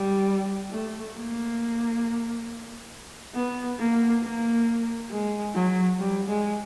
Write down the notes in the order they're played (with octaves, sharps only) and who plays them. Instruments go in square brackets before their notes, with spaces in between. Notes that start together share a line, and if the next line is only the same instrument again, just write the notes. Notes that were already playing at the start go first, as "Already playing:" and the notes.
Already playing: [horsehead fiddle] G3
A3
A#3
B3
A#3
A#3
G#3
F#3
G3
G#3